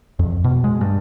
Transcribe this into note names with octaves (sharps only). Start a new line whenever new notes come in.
F2
B2
G#3
G2